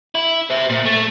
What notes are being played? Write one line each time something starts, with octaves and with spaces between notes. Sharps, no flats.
E4
C5 E5
A#2
A3